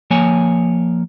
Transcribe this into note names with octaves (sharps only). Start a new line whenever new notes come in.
F3 A#3 C#5 G#5